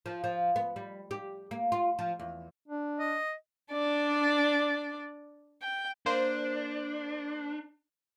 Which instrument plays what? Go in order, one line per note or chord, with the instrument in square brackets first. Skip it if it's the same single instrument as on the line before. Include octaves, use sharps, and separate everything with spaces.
[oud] F3
F3
B3
G3
G4
A#3
F4
F3
E2
[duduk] D4
[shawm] D#5
[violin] D4 D5
G5
[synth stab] A#3 C5 [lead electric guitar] D4